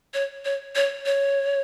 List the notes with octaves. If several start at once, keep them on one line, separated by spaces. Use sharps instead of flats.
C#5
C#5
C#5
C#5